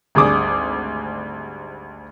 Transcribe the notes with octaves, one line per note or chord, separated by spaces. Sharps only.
G#1 D2 G3 G#4 D6 D#6